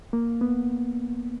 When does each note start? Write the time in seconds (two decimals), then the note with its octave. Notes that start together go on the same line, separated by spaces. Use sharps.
0.13 A#3
0.41 B3